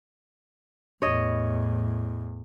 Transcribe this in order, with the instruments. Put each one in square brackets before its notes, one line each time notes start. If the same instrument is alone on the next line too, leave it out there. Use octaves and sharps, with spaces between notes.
[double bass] E2 A2 [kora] C#5 D#5